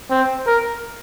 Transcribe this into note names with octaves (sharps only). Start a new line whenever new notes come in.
C4
A#4